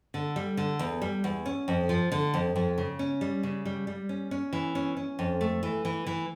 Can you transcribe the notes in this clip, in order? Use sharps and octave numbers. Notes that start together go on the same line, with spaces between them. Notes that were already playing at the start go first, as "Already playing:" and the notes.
D3
G3
D3
E2
G3
E2
C#4
F2
F3
D3
F2
F2
C#3
C#4
G3
C#3
G3
G3
C#4
C#4
E3
C#4
C#4
F2
A3
E3
E3
E3